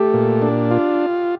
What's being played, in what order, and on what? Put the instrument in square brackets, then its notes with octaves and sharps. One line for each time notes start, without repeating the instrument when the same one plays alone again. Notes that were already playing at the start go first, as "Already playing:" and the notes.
Already playing: [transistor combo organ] A3 [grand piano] G4
[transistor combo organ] A#2
D4
F4